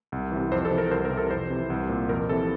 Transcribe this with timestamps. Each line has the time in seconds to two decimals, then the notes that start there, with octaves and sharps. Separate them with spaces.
0.12 C2
0.32 C3 E3
0.52 F2 C5
0.65 A4
0.71 C3 E3
0.78 A#4
0.91 C2 C5
1.05 A#4
1.11 C3 E3
1.17 A4
1.31 F2 C5
1.50 C3 E3
1.70 C2
1.89 A#2
2.09 F2 A#4
2.29 C3 A4
2.32 E3